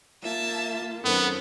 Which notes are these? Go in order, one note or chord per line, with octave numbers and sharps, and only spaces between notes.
A#3 F4 E5 A5
F#2 D#3 B3 C4 A4